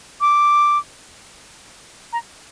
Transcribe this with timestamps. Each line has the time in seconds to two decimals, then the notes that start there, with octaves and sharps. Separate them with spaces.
0.21 D6
2.13 A#5